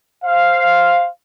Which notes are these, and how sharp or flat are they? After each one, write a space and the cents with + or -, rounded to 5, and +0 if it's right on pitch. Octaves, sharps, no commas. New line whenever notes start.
C5 +0 F5 +0